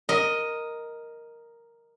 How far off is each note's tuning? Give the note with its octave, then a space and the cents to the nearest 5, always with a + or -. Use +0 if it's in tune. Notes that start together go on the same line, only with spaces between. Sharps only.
A#4 +0 D#5 +0